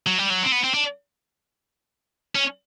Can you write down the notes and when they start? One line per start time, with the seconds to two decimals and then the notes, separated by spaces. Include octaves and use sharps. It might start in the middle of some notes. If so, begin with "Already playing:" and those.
0.07 F#3
0.18 G3
0.30 F#3
0.43 C4
0.52 B3
0.64 C4
0.74 D4
2.35 C#4